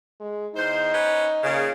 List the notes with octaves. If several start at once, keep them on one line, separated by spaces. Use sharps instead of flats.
G#3
E2 D#4 C5
C#4 B4 C5
A#2 C#3